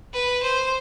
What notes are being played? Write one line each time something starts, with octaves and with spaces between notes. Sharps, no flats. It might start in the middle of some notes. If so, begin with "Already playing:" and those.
B4
C5